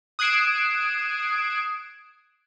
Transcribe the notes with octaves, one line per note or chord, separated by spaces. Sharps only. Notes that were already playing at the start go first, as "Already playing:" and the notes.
D#6 F#6 G#6 C7 D7 E7